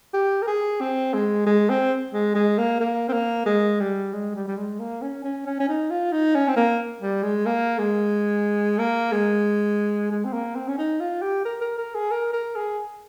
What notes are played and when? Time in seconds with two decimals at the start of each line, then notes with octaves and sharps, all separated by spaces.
0.14 G4
0.42 A#4
0.47 G#4
0.81 C4
1.14 G#3
1.46 G#3
1.70 C4
2.13 G#3
2.35 G#3
2.58 A#3
2.80 A#3
3.09 C4
3.13 A#3
3.46 G#3
3.80 G3
4.13 G#3
4.35 G3
4.47 G3
4.57 G#3
4.80 A#3
5.02 C#4
5.24 C#4
5.46 C#4
5.60 C#4
5.68 D#4
5.90 F4
6.12 D#4
6.35 C#4
6.48 C4
6.56 A#3
7.01 G3
7.23 G#3
7.46 A#3
7.78 G#3
8.78 A#3
9.12 G#3
10.11 G#3
10.24 C4
10.33 A#3
10.55 C4
10.68 C#4
10.78 D#4
11.00 F4
11.22 G4
11.45 A#4
11.61 A#4
11.78 A#4
11.95 G#4
12.11 A#4
12.33 A#4
12.55 G#4